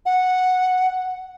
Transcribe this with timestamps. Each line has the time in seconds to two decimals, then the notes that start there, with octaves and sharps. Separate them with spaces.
0.06 F#5